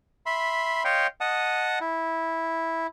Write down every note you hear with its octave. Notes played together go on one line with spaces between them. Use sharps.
E5 B5 C6
C#5 D#5 F5 G5 C6
D#5 F#5 A5 D#6
E4